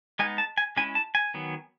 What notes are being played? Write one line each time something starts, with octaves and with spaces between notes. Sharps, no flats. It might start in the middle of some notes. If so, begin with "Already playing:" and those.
G#3 B3 D#4 G#5
A5
G#5
G#3 C#4 E4 G#5
A5
G#5
D#3 F#3 B3